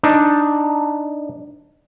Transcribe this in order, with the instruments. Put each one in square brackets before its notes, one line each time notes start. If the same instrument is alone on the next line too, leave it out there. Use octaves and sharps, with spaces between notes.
[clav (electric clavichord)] D4 D#4